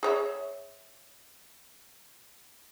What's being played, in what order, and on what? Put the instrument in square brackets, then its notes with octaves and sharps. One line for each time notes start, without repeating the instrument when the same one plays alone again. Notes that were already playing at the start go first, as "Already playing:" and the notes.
[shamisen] G#4 C#5 E5